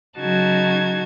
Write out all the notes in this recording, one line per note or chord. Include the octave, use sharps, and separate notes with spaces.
C#3 F#3 D#4 F#4 A5 G#6